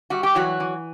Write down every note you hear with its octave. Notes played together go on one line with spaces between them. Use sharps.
G3 F#4
G4
E3 F#3 F#4
E3